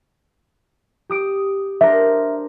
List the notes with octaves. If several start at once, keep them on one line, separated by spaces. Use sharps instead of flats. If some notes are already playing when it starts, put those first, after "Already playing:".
G4 D#6 D7
D4 A#4 C5 E5